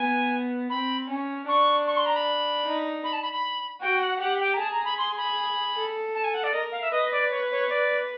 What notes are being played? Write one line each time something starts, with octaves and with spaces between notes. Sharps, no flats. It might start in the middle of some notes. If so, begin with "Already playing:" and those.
Already playing: B3 G#5
C4 B5
C#4
D4 C#6
C#6
C6
A#5
B5
D#4
B5
A5
B5
B5
F#4 G5
F#5
G4 F#5
G5
A#5
G#4 A5
A#5
B5
C6
B5
A4
A5
G#5
F#5
D5
A#4 D#5
F5
E5
B4 D#5
D5
C#5
C#5
D5